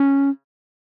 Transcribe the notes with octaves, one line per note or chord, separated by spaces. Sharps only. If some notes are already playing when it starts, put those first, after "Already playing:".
Already playing: C#4